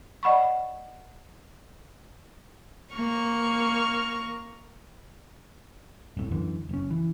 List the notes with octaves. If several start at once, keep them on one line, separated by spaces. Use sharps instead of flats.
D5 D#5 F#5 B5 C#6
A#3 C#6 F6
F1 C2 A2
F#2 D3 E3
F#1 C#4
E3